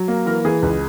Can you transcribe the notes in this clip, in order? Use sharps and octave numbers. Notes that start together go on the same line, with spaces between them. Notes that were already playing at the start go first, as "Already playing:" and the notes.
Already playing: F#3
A#3
E3 A#4
E3 G#4
C#2